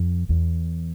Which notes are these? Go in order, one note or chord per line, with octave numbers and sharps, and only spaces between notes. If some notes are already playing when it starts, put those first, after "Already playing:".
Already playing: F2
E2